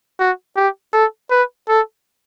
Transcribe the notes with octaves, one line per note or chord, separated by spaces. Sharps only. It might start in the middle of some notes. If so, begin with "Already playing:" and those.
F#4
G4
A4
B4
A4